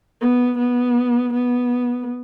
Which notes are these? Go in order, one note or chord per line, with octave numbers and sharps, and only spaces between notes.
B3
B3
B3